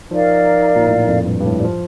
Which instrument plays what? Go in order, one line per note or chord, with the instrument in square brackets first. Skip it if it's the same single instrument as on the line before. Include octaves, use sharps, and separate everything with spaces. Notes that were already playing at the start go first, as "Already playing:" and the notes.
[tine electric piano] F3 [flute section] D#4 A#4 D5 F5
[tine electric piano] A#2
A2
F2
G2
G2
A2
G3
F3